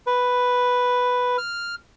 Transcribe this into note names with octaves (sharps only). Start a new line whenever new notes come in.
B4
F6